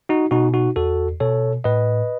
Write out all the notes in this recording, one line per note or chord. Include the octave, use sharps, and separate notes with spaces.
D#4 F#4
B2 D#4 F#4
D#4 F#4
E2 F#4 A4
B2 A4 C#5
A2 B4 D#5